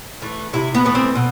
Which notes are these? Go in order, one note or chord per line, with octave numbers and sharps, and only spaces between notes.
E3 A3
C3 E4
B3
E3 A3 B3
C4
B2